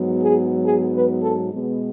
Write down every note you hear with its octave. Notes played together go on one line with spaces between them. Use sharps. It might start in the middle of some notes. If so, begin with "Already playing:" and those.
Already playing: G#2 F#3 B3
G#4
G#4
B4
A4
B2 G#3 B3